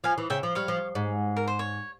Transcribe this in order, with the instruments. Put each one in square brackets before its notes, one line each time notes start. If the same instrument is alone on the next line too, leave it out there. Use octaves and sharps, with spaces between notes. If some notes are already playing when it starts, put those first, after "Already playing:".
[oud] F3 [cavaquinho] F5 G#5
[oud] E3
[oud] C#3 [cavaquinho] E5 G5
[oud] F3
[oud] G3 [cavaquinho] C#5 F5
[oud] F3
G#2
[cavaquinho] A#4
C5
C#5